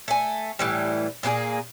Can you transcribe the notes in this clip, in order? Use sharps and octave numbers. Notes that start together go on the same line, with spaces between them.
A3 G#5
A2 E3 G3
A#2 A#3 D4 G#4